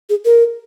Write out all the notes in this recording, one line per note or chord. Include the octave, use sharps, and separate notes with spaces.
G#4
A#4